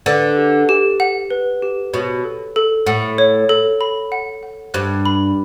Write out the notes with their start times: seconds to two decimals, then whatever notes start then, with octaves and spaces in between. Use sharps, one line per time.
0.06 D3 B4
0.37 G4
0.69 G4
1.00 F#5
1.30 B4
1.62 G4
1.93 B2 C#5
2.24 A4
2.56 A4
2.86 A2 F#5
3.18 C#5
3.49 A4
3.81 B5
4.12 F#5
4.43 F#5
4.74 G2 F#6
5.06 B5